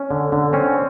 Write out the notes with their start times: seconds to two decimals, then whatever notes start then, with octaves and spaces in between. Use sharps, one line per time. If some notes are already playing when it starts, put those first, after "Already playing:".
Already playing: C#4
0.11 D3
0.32 D3
0.53 C4 C#4